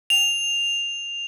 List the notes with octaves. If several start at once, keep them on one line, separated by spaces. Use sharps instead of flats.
F7